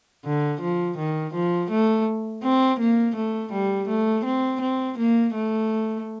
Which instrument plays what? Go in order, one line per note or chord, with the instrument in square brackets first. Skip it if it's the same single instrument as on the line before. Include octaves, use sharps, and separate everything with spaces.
[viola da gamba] D3
F3
D#3
F3
A3
C4
A#3
A3
G3
A3
C4
C4
A#3
A3